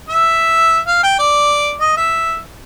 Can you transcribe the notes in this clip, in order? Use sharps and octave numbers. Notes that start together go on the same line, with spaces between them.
E5
F5
G5
D5
D#5
E5